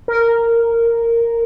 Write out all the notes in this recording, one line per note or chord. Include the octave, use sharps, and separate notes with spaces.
A#4